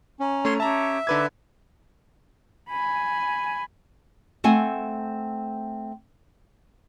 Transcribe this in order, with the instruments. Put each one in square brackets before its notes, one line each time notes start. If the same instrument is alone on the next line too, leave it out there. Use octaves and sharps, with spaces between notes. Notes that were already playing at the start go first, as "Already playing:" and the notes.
[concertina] C#4 [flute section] A#5
[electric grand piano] A3 C#4 [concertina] C#5 C6
[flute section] C#4 G4 [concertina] E5 [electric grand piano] A5 A#5
[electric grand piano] D3 B4 G#6 [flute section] D#4 A4 D6
[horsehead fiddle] G#5 B5
[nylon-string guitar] A3 C4 F#5 G#5